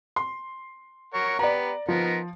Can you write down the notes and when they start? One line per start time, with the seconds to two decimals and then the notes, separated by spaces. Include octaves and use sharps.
0.16 C6
1.14 A#4 C#5 F#5
1.39 B3 G4 B4 D5 A#5
1.88 F3 B3 D#4 A#4